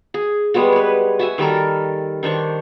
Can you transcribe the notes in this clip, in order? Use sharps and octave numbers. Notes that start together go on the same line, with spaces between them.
G#4
G3 G#3 B3 F#4
B4 C#5
F#4 E5 G#5
D#3 G3 A4 A#4
D#3 D4 C5 C#6